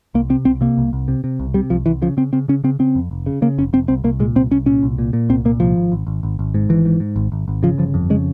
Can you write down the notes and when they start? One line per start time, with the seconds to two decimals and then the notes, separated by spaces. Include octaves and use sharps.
0.14 C2 A#3
0.30 C3 C4
0.45 C2 C4
0.61 C3 A#3
0.78 C2
0.93 C2
1.08 C3
1.24 C3
1.40 C2
1.54 C3 G3
1.70 C2 F3
1.86 C2 E3
2.02 C#3 F3
2.17 C#3 C4
2.33 C#3 C4
2.48 C#3 C#4
2.64 C#3 C4
2.79 C#3 C4
2.95 F2
3.11 F1
3.26 C#3
3.42 C#3 A#3
3.58 F1 C#4
3.73 F1 C4
3.88 C2 C4
4.04 C2 A#3
4.20 A#2 G#3
4.36 C2 C4
4.51 C2 C#4
4.66 A#2 C#4
4.83 C2
4.98 A#2
5.13 A#2
5.29 C2 C4
5.45 A#2 A#3
5.60 C2 F3
5.76 G#1
5.92 G#1
6.07 G#1
6.23 G#1
6.39 G#1
6.54 G#2
6.69 G#1 E3
6.85 G#2
7.00 G#2
7.16 G#1
7.32 G#1
7.48 G#1
7.63 C#3 F3
7.78 G1 F3
7.94 F2
8.10 C#3 G#3